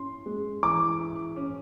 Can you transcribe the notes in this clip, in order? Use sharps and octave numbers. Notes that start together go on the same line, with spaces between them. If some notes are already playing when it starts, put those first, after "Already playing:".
Already playing: C#4 E4 C6
G#3
E3 D6
E4
C#4